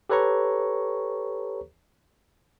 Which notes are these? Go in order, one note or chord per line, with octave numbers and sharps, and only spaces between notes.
G4 A4 B4 C#5 A#5 C#6